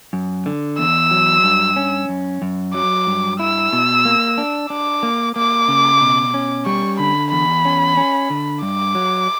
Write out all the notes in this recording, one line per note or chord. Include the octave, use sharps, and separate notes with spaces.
F#2
D3
E2 E6
F#3
G2
C#4
F#2
F#2
F#3 D6
G2
E4 E6
B2
A#3
D4
D4 D6
A#3
A#3 D6
C#3
B2
C#4
G3 C#6
D3 B5
E2 B5
C#4
C#4
D3
G2 D6
F#3